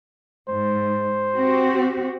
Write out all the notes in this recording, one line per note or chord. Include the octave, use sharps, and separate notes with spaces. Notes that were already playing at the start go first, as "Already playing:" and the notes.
G#2 C5
C4 F#4 G4